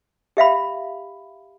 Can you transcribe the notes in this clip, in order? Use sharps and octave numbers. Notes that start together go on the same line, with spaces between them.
G4 E5 F5 B5